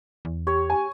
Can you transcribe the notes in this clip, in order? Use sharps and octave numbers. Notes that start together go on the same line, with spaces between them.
E2
G4 C#5
G#5